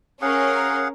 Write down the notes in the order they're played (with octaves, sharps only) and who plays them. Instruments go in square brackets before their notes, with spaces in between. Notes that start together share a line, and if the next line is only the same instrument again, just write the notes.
[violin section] C#4 A#4 [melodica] G#4 F5 F#5